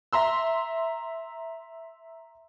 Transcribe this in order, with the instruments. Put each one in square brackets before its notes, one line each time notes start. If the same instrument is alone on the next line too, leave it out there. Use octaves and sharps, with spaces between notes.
[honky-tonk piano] E5 A#5 C6 E6